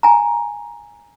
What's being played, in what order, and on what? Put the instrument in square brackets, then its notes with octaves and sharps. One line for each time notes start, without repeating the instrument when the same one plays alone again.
[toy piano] G#5 A#5